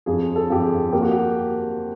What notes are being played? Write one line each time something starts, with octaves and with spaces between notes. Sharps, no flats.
F2 G#4
A4
F2 G4
G#4
A#3 G4
F#4
G4